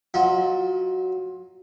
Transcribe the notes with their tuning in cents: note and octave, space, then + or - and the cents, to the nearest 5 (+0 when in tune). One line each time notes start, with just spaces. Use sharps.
F#3 +0 F4 +20 D#5 +45